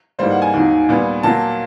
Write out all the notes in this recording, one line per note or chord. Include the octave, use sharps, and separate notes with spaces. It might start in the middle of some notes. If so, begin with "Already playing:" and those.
G#2 E3 G3 A#3 C5
F#5
G#5
D#2 D#3 F#3
A#2 G3 B3
A#2 F#3 A#3 A5